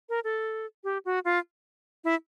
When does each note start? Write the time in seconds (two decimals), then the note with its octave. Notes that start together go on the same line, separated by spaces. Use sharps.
0.09 A#4
0.24 A4
0.84 G4
1.05 F#4
1.25 F4
2.04 E4